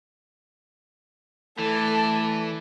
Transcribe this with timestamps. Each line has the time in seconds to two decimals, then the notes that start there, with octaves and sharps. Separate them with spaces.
1.59 E3 A3 A4 D5